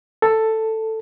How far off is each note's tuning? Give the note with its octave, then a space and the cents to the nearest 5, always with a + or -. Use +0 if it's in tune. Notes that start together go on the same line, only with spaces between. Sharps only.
A4 +10